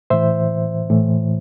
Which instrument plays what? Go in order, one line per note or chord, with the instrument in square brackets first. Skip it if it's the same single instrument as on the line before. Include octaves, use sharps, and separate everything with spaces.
[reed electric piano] A2 E3 C5 E5
A2 E3